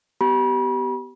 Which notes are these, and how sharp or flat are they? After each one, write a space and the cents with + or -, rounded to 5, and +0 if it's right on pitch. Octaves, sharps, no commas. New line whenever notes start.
B3 +15 G4 -20 B5 -40